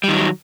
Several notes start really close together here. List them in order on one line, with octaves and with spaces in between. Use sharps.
G3 D#3 F#3